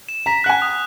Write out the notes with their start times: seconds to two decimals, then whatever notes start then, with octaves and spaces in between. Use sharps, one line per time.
0.09 E7
0.26 A#5 B6
0.44 F#5 F#6
0.49 G#5
0.62 D#6